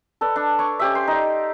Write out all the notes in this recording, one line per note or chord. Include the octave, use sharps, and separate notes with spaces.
A4 B4 D5
D4
C#5 C#6 D6
C#4 G4 E5
C5 C6
D#4 D5